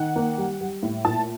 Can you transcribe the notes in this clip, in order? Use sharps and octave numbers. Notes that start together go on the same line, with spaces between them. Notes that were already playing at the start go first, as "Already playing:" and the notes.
Already playing: D#3 F#5
A#3
G3
G3
A2
A#2 A5